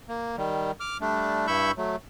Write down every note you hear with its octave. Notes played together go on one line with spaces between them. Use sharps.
A#3
D#3 G3
D6 F6
G3 A3 D4
G2 E4 B5 C#6 E6 G6
F#3 A3